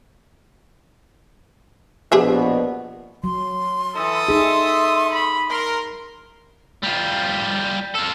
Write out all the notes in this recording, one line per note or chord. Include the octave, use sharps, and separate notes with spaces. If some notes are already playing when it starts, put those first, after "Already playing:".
A#1 B2 G4 G#4 E5
F#3 C6
E3 A4 D#6
D#4 G#4 E5 C6
B5
A#4 C6
G3 F4
F4 A4